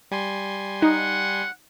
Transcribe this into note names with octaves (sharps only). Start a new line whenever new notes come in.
G3 G#5 C6
D#4 F#5